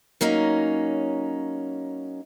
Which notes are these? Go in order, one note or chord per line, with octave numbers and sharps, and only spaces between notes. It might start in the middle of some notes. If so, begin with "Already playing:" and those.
F#3 A#3 C#4 D#4